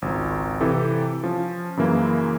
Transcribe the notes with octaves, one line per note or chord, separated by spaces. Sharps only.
G#1 C#2
C3 E3 E4 G4 A4
F3 C#4
F#2 C#3 E3 A#3 E4